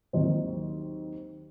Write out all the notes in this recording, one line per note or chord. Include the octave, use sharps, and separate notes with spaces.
D#2 D#3 F#3 C4 D#4